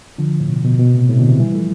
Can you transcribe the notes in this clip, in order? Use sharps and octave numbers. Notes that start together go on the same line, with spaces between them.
D3 F3
A2
B2
B2
B2
A2 C3
A2 C3
B2 D3
C3 E3
E3 G3
F3 A3